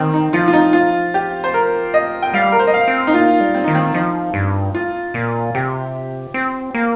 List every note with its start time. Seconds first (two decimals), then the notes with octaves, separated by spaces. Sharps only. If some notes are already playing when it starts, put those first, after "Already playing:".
Already playing: D#3 C4
0.14 D#4
0.33 F3 F4
0.48 F4
0.53 D#4
0.73 F4
1.14 G4
1.44 C5
1.54 A#4
1.94 D#5
2.22 G5
2.34 G3 F5
2.52 A#4
2.59 C5
2.67 D#5
2.74 F5
2.88 C4
3.07 D#4
3.14 A#3 F4
3.40 G3
3.54 C4
3.64 D#3 D#4
3.75 C4
3.94 F3 D#4
4.34 G2
4.75 F4
5.14 A#2
5.55 C3 G4
6.34 C4
6.74 A#3